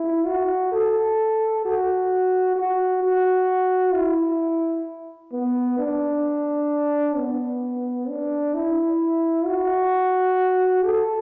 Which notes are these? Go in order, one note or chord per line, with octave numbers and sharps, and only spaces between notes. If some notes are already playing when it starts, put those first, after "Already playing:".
Already playing: E4
F#4
A4
F#4
F#4
F#4
E4
B3
D4
B3
D4
E4
F#4
A4